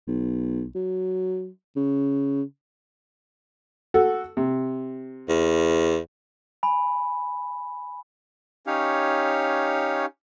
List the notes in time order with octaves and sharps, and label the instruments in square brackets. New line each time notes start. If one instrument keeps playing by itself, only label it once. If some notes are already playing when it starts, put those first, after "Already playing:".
[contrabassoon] B1
F#3
C#3
[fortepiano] F#4 A4
C3
[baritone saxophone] E2
[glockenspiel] G#5 B5
[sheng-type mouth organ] C#4 D#4 G4 C#5 F5